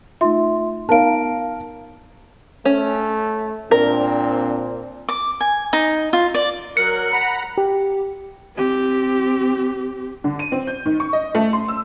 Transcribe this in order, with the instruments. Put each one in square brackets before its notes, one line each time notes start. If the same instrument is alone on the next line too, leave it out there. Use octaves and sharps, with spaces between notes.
[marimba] A3 D#4 F4 [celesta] E5 C6
[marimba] B3 D#4 C#5 [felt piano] A#4 F5 [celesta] A5 D7
[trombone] A3 [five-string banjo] C#4
[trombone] A#2 [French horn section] C4 D4 [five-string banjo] A#4
[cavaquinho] D6
G#5
D#4
F4
D5
[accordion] F#3 A#4 F#6 [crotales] C#7
[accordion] F#5 A#5 B5
[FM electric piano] G4
[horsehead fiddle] C4 G4
[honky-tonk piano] D3
D#7
C4
G6
D#3
C#6
D#5
A3
C6
E6